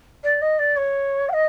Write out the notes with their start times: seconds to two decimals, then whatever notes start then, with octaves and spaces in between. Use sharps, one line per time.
0.24 D5
0.41 D#5
0.59 D5
0.76 C#5
1.29 G5
1.33 D#5